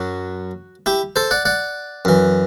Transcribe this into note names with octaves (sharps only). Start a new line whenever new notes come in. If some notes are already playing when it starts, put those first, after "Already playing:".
Already playing: F#2 F#3 F#4
E4 G4
A4 C5
D5 F#5
D5 F#5
F#2 E3